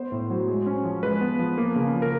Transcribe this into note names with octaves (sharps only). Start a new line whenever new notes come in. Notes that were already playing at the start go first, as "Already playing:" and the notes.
Already playing: B3 C5
A2
F#3
G#3
C#4
F3
G#3 B4
B3
F3
A#3
C#3
F3
A#4